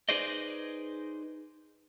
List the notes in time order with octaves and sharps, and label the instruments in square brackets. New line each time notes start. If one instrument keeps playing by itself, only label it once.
[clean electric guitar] D#4 G#4 B4 C5 D5 D#5